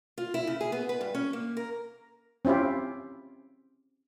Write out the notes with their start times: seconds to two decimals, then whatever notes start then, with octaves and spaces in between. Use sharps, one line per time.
0.18 F4
0.34 E4
0.47 C#3
0.61 G#4
0.72 B3
0.89 B4
1.01 G2
1.15 C#4
1.33 A#3
1.57 A#4
2.45 C4 C#4 E4 F4 G4